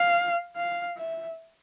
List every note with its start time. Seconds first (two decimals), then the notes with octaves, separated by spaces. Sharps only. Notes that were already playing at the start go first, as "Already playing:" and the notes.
Already playing: F5
0.56 F5
0.97 E5